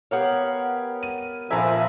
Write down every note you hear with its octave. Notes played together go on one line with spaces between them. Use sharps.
B3 G4 A#4 C#5 F5 F#5
D#7
A#1 F3 A#4 E5 G#5 B5 D6